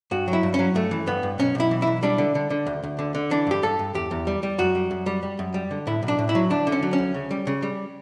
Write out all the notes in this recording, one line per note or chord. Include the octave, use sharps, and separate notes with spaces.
G2 F#4
F#3
E4
G2
C#4
F#3
G2 A3
E3
G2 B3
G2
B1 C#4
B1 E4
E3
E4
B1
G3 D4
D3
D3
D3
D2
D2
D3
D3
E3 D4
G2 G4
G2 A4
G2
E2 G4
E2
G3
G3
F#2 F#4
G3
F#2
G3
G3
F#2
G3
D3
A2 E4
B1
D4
A2
E4
F#3
D2 D4
D3
C#4
F#3
C#4
D2
C#3
G3
C#3
G3